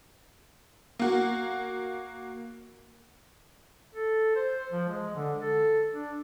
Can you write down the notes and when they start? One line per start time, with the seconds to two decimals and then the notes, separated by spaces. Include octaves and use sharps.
0.99 A#3 F#4
3.95 A4
4.36 C5
4.72 F3
4.88 G#3
5.16 D3
5.41 A4
5.92 D4